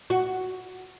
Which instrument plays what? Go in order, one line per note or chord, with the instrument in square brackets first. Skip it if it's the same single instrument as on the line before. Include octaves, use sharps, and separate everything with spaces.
[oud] F#4